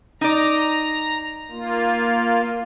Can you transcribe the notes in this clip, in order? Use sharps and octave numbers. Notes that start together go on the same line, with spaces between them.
D#4 D5 A#5
A#3 F4